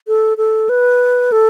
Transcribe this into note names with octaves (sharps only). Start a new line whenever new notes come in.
A4
A4
B4
A4